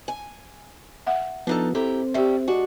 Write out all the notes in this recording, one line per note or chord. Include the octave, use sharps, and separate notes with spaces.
G#5
E5 F#5
F3 B3 D4 D#4 A4
C4 E4 G4 A4 A#5
G3 A3 G4 E5
G#3 D4 F#4